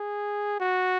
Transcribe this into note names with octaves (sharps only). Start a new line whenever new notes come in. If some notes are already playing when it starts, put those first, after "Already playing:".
Already playing: G#4
F#4